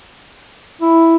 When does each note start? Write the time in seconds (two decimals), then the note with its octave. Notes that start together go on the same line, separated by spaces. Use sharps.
0.81 E4